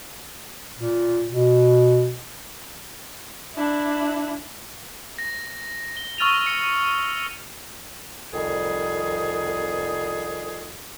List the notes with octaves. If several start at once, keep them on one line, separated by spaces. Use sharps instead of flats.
A#2
B2
D4 E4
A#6
G7
C#6 E6 F6 A6 D#7 F7
C#7
C2 F2 D#3 G3 G#4